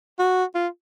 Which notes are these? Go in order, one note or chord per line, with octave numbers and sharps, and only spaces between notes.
F#4
F4